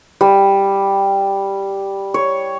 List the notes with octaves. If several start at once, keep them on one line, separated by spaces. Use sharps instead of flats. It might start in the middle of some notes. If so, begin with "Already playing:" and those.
G3
C#5